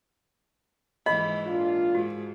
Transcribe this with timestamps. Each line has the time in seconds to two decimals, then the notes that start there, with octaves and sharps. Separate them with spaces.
1.06 G#2 E3 D#5 B5
1.46 A#2 D4 F4
1.95 G#2 F#4